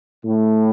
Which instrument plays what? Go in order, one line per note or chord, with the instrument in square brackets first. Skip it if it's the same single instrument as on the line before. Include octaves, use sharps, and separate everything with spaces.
[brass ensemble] A2